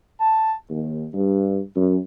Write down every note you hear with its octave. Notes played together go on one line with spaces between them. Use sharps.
A5
D#2
G2
F#2